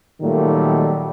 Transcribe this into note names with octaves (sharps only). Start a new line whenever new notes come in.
A#2 D#3 F#3 G3 A3